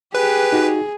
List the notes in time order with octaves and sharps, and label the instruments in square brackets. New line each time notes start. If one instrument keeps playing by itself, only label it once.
[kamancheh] G4 [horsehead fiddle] G#4 [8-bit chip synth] B4
[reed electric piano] D#4 F#4